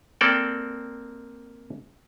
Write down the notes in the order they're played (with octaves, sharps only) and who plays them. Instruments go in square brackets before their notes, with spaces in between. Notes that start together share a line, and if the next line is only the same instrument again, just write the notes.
[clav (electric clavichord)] A#3 C4 A4 D5 G5